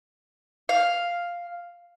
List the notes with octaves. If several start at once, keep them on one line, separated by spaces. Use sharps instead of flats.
F5